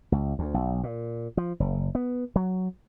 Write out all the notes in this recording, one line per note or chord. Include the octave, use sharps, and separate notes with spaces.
C#2
D2
B1
A#2
F3
F#1
B3
F#3